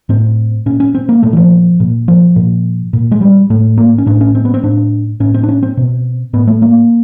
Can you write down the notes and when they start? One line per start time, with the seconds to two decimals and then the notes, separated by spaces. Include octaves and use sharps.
0.09 A2 C4
0.66 A#2 C#4
0.80 C#4
0.95 C4
1.09 A#3
1.23 A#2 A3
1.33 E3
1.37 F3
1.80 A#2
2.08 F3
2.36 A#2
2.93 A#2
3.11 G#3
3.21 G3
3.50 A2 A3
3.78 A#3
3.98 C#4
4.06 A2 D4
4.21 C#4
4.35 C4
4.45 B3
4.54 C4
4.63 A2 D4
5.20 A2 C#4
5.34 C4
5.43 D4
5.49 C#4
5.63 C4
5.77 B2
6.33 A2 B3
6.47 A3
6.62 A#3